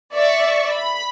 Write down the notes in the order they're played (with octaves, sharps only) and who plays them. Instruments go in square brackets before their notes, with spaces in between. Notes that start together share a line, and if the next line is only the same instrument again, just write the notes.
[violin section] D5 E5 C#6
B5